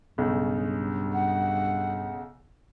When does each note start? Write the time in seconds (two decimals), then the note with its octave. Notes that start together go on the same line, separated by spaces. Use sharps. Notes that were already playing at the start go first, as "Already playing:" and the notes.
0.18 B1 G2 C#3
1.13 F#5